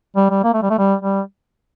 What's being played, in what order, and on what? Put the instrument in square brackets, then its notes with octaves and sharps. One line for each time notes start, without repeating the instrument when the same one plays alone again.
[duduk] G3
G3
A#3
A3
G3
A3
G3
G3